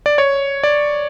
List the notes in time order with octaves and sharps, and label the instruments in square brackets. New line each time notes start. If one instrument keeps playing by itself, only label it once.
[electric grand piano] D5
C#5
D5